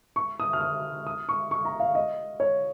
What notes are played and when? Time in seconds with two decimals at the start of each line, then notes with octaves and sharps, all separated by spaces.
0.16 C#6
0.40 D#6
0.53 F6
0.61 D#6
1.07 D#6
1.29 C#6
1.51 C#6
1.65 A#5
1.80 F5
1.95 D#5
2.40 C#5